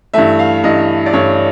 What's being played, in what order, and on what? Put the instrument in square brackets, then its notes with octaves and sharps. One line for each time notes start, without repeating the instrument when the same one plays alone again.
[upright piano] G2 E3 A3 E5
F5
G2 E3 A3 D#5
D5
G2 E3 A3 C#5